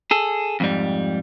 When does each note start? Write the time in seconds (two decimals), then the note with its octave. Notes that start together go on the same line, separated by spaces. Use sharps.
0.11 G#4 A4
0.60 F2 G#2 G3